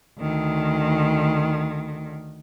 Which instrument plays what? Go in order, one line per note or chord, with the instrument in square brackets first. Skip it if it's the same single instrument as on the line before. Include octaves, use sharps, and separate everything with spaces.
[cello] D2 D#3